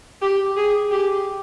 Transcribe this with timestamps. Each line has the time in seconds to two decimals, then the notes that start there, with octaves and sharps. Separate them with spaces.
0.22 G4
0.57 G#4
0.91 G4